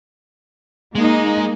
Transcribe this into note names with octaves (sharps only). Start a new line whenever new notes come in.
G#3 A#3 D#4